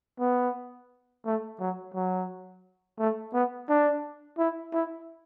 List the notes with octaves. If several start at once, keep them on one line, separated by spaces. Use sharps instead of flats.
B3
A3
F#3
F#3
A3
B3
D4
E4
E4